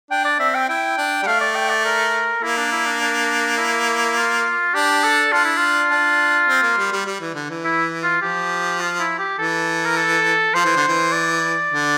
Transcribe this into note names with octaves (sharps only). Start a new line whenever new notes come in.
D4 G5
D5
C4 E5
G5
E4 G5
D4
G3
A3 F5
D5
G5
D5
A#4
A#3 E4
D4
E4
D4
D4
E4
F4
D4 G4
A4
D4 F4
E4
F4
D4
C4
A#3
G3
G3
G3
E3
D3
E3
E4
F4
F3 G4
F4
E4
G4
E3 A4
A#4
A4
F3 C5
E3
D3
E3
D5
D3